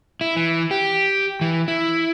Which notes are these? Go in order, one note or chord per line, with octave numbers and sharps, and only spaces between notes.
E4
E3
G4
E3
E4